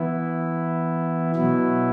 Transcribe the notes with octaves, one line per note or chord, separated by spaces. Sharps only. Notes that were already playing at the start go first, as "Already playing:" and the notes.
Already playing: E3 B3 E4
B2 F#3 B3 E4